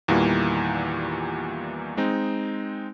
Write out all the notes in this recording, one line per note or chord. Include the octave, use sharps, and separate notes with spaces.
E2 A#2 D#3 E3 G3 A#3
G#3 C4 D#4